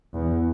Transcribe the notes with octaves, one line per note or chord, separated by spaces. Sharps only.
E2